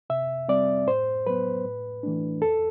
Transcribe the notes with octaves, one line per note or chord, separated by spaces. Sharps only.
C3 E5
G3 C4 D5
A2 C5
F#3 B3 B4
A2
E3 A3 D4
E2 A4